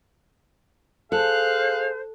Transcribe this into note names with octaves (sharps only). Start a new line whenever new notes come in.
G#4 A4 C5 F5 F#6